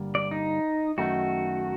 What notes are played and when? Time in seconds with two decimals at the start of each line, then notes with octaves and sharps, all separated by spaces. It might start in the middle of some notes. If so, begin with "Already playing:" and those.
Already playing: G2 D3 G3 A#3
0.15 D5
0.31 D#4
0.98 F#2 D#3 A3 D#4 F#4